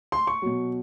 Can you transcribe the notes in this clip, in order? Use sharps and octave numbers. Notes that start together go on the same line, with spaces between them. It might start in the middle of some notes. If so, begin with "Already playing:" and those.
C6
C#6
B2 F#3